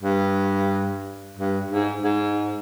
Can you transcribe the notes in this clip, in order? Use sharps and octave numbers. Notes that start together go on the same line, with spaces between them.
G2
G2
G#2
G#2